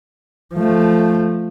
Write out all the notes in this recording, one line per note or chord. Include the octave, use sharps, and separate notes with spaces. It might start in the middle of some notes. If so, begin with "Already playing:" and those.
F3 A3